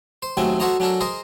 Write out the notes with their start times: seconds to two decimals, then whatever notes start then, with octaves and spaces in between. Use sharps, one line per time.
0.22 C5
0.37 D#2 F#3 A3 C4 G#4 G#5
0.60 F#4 A4 C5 C#5 D#5 A#5
0.80 F#3 C#4 D4 A4 A#4
1.01 G#4 A#4 C5 D#5